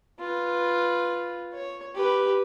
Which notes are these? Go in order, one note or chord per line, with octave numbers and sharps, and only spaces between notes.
F4 B4
C#5
G4 B4